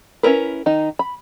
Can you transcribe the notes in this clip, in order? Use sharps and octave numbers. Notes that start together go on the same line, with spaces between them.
C#4 D4 E4 A#4 B4
D#3 D#4
B5